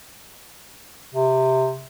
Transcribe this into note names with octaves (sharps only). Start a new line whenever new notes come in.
C3